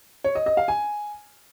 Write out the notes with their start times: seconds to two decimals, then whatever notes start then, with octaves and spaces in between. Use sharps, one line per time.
0.24 C#5
0.35 D#5
0.46 D#5
0.57 F5
0.68 G#5